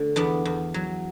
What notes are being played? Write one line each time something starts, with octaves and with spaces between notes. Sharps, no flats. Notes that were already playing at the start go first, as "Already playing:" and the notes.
Already playing: D3 A3
E2 B3 D4
E2
F#3